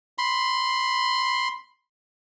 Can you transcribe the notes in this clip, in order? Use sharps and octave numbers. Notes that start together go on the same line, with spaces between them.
B5 C6